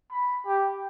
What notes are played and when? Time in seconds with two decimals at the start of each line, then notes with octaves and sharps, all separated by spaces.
0.11 B5
0.46 G4